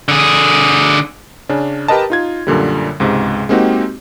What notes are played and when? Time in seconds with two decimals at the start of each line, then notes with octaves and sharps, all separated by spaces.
0.08 D3 G#4
1.49 C#3 C#4 D4
1.88 G4 A#4 B4 D#5 A5
2.10 D#4 F4 G#6
2.47 F#2 A#2 D3 G3
3.00 C#2 G#2 C3
3.49 G#3 A#3 C4 D#4 F#4 G4